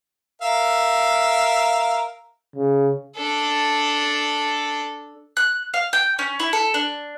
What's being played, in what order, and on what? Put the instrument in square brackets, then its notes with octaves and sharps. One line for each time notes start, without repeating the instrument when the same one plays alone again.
[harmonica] A#4 E5 F5
[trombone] C#3
[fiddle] D4 A4
[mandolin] F#6
F5
G5
C#4
E4
A4
D4